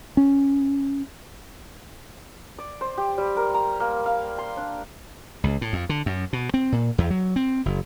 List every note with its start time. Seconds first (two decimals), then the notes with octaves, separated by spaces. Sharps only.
0.17 C#4
2.59 D5
2.81 C5
2.98 G4
3.18 G3
3.37 A#4
3.54 A#5
3.80 A#3
4.06 F5
4.38 C6
4.57 D4
5.44 C#2
5.61 A2
5.73 F2
5.89 D3
6.06 F#2
6.33 B2
6.54 C4
6.72 A#2
6.98 E2
7.10 F#3
7.36 C4
7.66 F#1